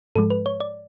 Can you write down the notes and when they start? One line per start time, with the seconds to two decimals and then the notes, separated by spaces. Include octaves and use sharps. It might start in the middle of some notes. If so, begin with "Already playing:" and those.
0.16 G#2 F3 G#3 A4
0.30 B4
0.46 C#5
0.60 D5